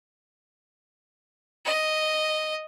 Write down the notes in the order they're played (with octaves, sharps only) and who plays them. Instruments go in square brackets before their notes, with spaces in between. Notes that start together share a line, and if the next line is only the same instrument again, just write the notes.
[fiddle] D#5